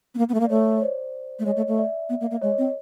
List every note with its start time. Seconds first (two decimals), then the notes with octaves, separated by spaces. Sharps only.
0.15 B3
0.18 A#3
0.29 B3
0.34 A3
0.40 A#3
0.44 D5
0.50 A3 C#5
0.77 C#5
0.82 C5 D5
1.39 A3
1.45 G#3 C#5 D#5
1.56 A3
1.68 A3
1.78 D5 E5
2.09 B3
2.21 A#3
2.31 A#3
2.41 G#3 C#5 D#5
2.58 C4